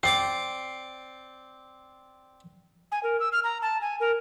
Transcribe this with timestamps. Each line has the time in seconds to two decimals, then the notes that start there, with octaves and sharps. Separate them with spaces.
0.03 C4 D5 D6 C7
2.92 G#5
3.03 A#4
3.20 E6
3.32 F6
3.44 A#5
3.62 A5
3.81 G#5
4.00 A#4